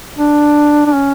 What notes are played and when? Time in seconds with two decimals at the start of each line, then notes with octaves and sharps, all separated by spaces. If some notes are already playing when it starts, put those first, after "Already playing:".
0.18 D4
0.86 D4
0.94 C#4